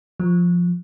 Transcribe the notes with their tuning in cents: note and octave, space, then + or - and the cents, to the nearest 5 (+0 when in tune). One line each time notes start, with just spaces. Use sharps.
F3 +5